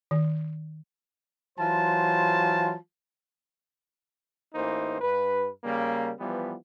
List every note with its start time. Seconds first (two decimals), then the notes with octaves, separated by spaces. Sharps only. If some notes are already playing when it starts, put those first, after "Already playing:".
0.11 D#3
1.59 E3 F#3 F4 C5 A5
4.54 A1 E3 A#3 D#4 C5
5.01 G2 B4
5.64 C#3 G3 A#3
6.19 E3 F3 G3 B3